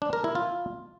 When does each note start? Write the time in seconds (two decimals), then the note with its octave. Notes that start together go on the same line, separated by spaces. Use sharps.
0.02 D4
0.13 A#4
0.24 E4
0.35 F4